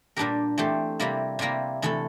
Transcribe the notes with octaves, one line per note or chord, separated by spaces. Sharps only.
A#2 G3 D4 G4 A#4
E3 A3 C4 G4 C5
C3 G3 A#3 E4 A#4
C3 G3 A#3 E4 A#4
C3 E3 A3 E4 A4